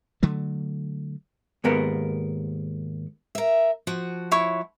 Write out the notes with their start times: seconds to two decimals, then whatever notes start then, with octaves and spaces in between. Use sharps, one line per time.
0.23 D3 F#3 A3
1.64 D#2 G#2 B3 A#4
3.35 A#4 E5
3.87 F3 F#4
4.31 E4 C#5 C#6